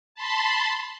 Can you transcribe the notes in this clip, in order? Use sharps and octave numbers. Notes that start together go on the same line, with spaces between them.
A5 B5 C6